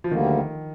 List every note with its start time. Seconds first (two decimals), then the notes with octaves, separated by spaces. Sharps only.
0.04 F3
0.11 D2 D3 D#3 G3 A#3